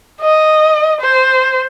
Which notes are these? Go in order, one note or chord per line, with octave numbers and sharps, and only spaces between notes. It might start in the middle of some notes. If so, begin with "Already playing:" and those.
D#5
C5